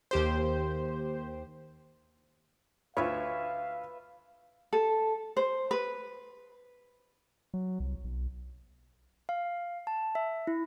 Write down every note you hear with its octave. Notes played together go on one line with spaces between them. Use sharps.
D#2 G4 C5
D2 F4 B4 C#5 E5 F5
A4
C5
B4
F#3
C2
B1
F5
A5
E5
E4